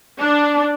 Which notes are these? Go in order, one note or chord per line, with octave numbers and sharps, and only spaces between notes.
D4